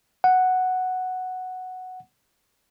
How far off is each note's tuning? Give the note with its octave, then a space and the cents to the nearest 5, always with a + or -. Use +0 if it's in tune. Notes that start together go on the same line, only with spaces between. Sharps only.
F#5 +0